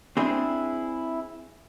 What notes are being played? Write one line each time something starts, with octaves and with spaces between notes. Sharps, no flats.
C4 D4 E4 G#4